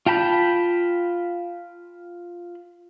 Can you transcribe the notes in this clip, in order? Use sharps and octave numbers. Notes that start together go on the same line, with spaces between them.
F4 G5 A5 B5 G6